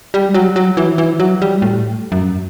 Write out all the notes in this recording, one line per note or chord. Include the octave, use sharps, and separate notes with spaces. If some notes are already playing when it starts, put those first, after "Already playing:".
G3
F#3
F#3
E3
E3
F#3
G3
A2
F#2